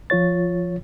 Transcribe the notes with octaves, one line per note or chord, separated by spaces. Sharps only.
F3 F4 C#5 A6